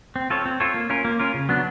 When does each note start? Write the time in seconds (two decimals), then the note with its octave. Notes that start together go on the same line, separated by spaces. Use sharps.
0.16 C4
0.30 F4 A4 C#5
0.45 C4
0.60 F4 A4 C#5
0.74 A#3
0.90 C#4 F4 A#4
1.05 A#3
1.19 C#4 F4 A#4
1.34 C#3
1.49 F#3 B3 D4